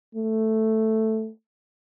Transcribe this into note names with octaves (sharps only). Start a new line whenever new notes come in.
A3